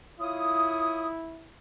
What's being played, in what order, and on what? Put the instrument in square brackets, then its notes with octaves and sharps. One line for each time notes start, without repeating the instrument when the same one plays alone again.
[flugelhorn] E4 [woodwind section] F4 C#5 D#6